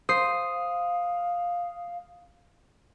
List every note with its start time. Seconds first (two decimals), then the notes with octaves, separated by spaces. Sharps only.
0.09 C5 F5 D#6 C7